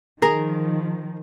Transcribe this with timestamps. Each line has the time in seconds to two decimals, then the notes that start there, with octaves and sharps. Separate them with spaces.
0.22 D#3 F3 G#4 A#4 A#5